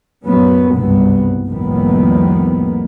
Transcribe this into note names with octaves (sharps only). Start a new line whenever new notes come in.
F#2 A2 F#3 B3 C#4
F#1 C2 G2 C3 B3
C2 F2 A2 D#3 A#3 B3